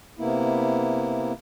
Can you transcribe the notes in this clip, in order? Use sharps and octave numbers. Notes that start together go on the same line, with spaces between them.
C3 A#3 B3 E4